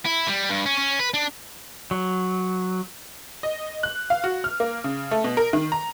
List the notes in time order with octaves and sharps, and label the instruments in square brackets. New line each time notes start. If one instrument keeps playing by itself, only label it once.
[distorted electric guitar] E4
G3
G2
C#4
C#4
B4
D4
[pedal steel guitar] F#3
[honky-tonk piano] D#5
F#6
F5
F#4
F6
A#3
C#3
A3
B2
A#4
D#3
A#5